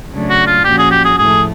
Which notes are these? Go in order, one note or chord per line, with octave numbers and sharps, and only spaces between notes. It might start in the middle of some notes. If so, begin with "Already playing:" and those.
C#3 F#3 A3 D4
F#4
F4
A#2 F3 A#3 C#4 F#4 G4
G#4
G4
G#4
A2 F3 A3 G#4